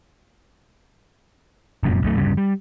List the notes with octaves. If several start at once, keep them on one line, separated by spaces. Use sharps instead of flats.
F1 F#2 A#2
B1 F#2 A3
D1 G2 C#3 G3
G3